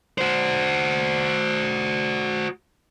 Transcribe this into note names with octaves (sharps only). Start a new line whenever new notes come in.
F#4 C5